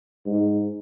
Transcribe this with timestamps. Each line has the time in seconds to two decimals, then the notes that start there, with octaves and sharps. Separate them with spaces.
0.26 G#2